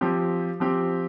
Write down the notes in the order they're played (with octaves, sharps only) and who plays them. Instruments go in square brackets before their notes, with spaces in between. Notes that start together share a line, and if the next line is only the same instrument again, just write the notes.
[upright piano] F3 C4 G4
F3 C4 G4